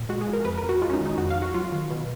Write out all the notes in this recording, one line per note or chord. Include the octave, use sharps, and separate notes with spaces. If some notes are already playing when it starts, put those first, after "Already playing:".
Already playing: A#2
G#3 F#4
G#4
F3
A#4
F2 B4
A#4
F2
F#4
G#3 F4
C#4
D#4
D#3
D#4
F2 F#4
F5
F2
F#4
F#3 F4
D#3
B2